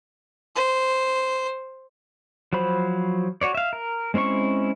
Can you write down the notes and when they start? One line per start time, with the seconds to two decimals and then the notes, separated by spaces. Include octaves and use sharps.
0.55 C5
2.53 F3 F#3 C5 B5
3.41 F#4 C#5 D5
3.55 E5 F5
3.73 A#4
4.14 G#3 C4 C#4 E4 C#6